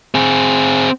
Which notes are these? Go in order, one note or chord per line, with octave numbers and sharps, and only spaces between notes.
C4 G#4